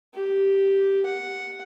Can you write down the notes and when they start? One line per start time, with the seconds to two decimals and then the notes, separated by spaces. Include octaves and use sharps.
0.14 G4
1.06 F#5